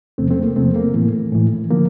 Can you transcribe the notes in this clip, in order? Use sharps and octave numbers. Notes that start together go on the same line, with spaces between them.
E2 C3 F3 A3 C4
A3 C4
A#3
E2 C3 F3 A3 C4
A#3
A2 E3 A3
A2 E3
D3 F3 A#3